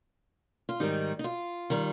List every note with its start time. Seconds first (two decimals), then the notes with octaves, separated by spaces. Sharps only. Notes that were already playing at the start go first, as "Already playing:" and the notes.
0.69 F4
0.80 G#2 D#3 G3 D#4
1.19 D#4
1.24 F4
1.70 D#3 G3